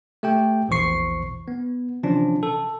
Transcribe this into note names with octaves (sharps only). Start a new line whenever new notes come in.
A3 G4 G5
A#1 E2 E3 C5 C#6 C7
B3
C3 E3 F3 C#4 D4
A4